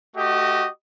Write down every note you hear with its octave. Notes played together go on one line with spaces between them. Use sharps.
A3 F#4 G4 D#5